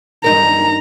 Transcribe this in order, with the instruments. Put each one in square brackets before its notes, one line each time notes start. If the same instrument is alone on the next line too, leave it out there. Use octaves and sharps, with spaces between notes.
[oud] G2 D#4 A#4 [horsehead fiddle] A#5